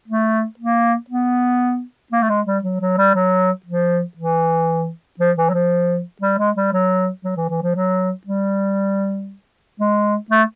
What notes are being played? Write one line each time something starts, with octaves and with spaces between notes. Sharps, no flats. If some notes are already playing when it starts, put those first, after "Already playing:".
A3
A#3
B3
A#3
A3
G#3
G3
F#3
F#3
G3
F#3
F3
E3
F3
E3
F#3
F3
G3
G#3
G3
F#3
F#3
E3
E3
F3
F#3
G3
G#3
A3